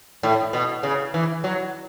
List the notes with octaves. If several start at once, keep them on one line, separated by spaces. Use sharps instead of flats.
A2
B2
C#3
E3
F#3